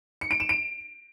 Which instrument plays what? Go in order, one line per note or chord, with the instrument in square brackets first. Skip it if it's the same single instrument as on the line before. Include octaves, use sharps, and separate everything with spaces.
[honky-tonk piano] C#7
D7
E7
D7